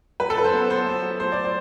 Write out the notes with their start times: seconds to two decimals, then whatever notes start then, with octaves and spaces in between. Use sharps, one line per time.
0.20 F#3 B4
0.30 A4
0.36 F#2 B4
0.44 C5
0.53 B3
0.70 B3 C5
0.87 B3
1.02 F#3
1.20 A3 C5
1.32 D5
1.45 C5